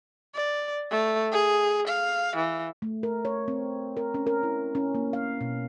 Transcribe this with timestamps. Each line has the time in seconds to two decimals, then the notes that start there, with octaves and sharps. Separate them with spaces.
0.35 D5
0.91 A3
1.32 G#4
1.87 F5
2.36 E3
2.82 A3
3.03 A#4
3.25 C#5
3.48 C4
3.97 A#4
4.14 C#4
4.27 A#4
4.43 E4
4.75 C#4
4.95 A#3
5.13 F5
5.41 B2